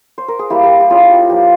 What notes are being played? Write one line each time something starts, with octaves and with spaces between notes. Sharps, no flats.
C5
A#4
G#4
G3 A#3 E4 G4
G4 A#4
G4
G3 C#4 E4 F4 G#4
G4
F3 A#3 F4 G4